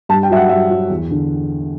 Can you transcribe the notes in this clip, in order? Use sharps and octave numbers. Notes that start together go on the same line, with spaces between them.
G2 A5
G5
F#3 E5
F#5
G2 E5
F#3
E2
D3